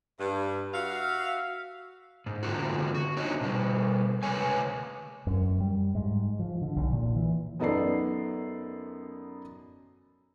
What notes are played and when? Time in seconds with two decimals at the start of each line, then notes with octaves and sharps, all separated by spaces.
0.18 G2
0.73 F#4 E5 F5
2.26 G#2
2.43 D3 G#3 C4 F4 F#4
2.94 F#4
3.17 C4 D4 D#4 C#5 D#5
3.41 B2 G3
4.23 C3 G#3 B4 C#5 G#5
5.27 F#2
5.60 G3
5.95 G#2
6.39 F3
6.62 D3
6.76 B1
6.93 A#2
7.16 E3
7.60 F#2 B3 D#4 A4 D5 C7